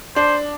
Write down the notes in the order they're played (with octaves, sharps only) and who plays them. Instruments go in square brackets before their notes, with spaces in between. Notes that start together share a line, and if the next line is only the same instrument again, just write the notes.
[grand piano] D4 [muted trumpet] C5